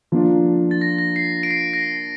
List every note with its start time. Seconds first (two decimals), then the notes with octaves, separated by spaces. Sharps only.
0.12 F3 A#3 D4 F4
0.71 A6
0.81 A#6
0.98 A#6
1.16 C7
1.43 D7
1.51 C7
1.73 A#6